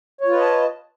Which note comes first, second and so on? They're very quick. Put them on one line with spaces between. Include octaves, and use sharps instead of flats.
C#5 F4 B4 D#5 A5